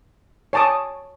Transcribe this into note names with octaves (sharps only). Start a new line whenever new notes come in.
C#5 G#5 A5 D6 D#6